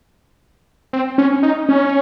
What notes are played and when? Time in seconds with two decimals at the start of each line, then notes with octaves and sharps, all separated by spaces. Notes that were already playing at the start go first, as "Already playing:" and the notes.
0.93 C4
1.18 C#4
1.43 D#4
1.69 C#4